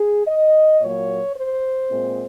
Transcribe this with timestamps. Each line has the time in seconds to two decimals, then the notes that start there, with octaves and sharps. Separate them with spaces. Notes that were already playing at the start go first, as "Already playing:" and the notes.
Already playing: G#4
0.28 D#5
0.81 A#2 F#3 A#3 C#5
1.36 C5
1.89 A#2 G#3 C4